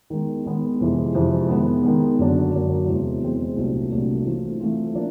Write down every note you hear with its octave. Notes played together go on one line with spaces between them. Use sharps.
D#3 G#3 B3
D#3 G#3 B3
F2 C3 E3 G#3
F2 C3 E3 G#3
D#3 G#3 B3
D#3 G#3 B3
F#2 D3 F#3 A#3 D4
F#2 D3 F#3 A#3 D4
E2 C3 E3 G#3 C4
E2 C3 E3 G#3 C4
C2 A#2 F#3 A3 D4
C2 A#2 F#3 A3 D4
E3 A3 C4 F4
E3 A3 C4 F4
F3 A#3 D4